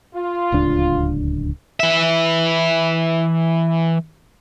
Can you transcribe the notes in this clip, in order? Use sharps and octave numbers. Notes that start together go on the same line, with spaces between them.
F4
D1 C#2 D4
E3 E5